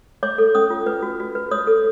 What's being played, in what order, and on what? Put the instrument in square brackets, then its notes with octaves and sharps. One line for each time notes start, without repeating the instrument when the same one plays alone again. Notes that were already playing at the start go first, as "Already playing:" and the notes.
[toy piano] C#5 D6
A4
C#4 D#6
F4
B4
F#4
F#4
B4
C#5 D#6
A4